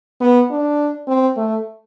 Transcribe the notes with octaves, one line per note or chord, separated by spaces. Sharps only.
B3
D4
C4
A3